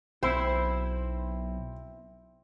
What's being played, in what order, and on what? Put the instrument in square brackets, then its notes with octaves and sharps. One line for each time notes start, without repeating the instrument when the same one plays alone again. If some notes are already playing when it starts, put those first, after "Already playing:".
[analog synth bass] B1 [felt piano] C4 [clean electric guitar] E4 [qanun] C5